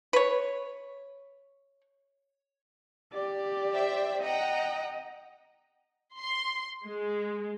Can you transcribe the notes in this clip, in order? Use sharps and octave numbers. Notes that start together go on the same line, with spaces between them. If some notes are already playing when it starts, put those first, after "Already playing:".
B4 C#5
G4 D5
C5 E5 G5
D#5 F#5 G5 A#5
C6
G#3